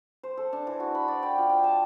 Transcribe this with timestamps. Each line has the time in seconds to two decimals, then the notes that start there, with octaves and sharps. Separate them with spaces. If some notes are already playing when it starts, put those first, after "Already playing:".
0.23 C5
0.37 A4
0.53 D4
0.67 E3
0.80 F#4
0.95 B5
1.08 D5
1.23 G5
1.38 F4
1.49 G5
1.64 A5